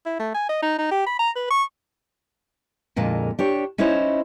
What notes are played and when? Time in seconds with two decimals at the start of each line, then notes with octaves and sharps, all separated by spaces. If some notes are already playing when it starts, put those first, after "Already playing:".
0.06 E4
0.20 A3
0.34 G#5
0.49 D#5
0.63 D#4
0.78 D#4
0.91 G4
1.07 B5
1.19 A#5
1.36 B4
1.50 C#6
2.96 F2 A#2 D3 G#3 A#3
3.39 D4 G4 C#5
3.78 C#4 D#4 E4 C5 C#5 D#5